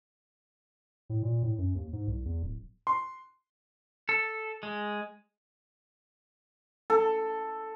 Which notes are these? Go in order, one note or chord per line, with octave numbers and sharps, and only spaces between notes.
A2
A#2
A2
F#2
D#2
G#2
C2
E2
D1
C6
A4
G#3
A4